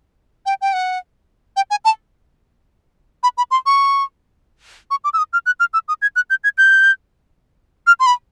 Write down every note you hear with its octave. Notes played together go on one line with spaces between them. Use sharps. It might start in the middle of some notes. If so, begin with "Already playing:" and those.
G5
G5
F#5
G5
G#5
A5
B5
B5
C6
C#6
C#6
D6
E6
D#6
F6
F#6
F6
E6
D#6
G#6
F#6
G6
G#6
G6
F6
C6
B5